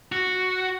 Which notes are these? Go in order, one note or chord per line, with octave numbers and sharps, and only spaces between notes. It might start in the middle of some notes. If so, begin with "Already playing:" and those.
F#4